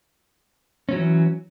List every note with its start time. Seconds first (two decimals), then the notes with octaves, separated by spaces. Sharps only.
0.89 C#4
0.92 F#3
0.96 E3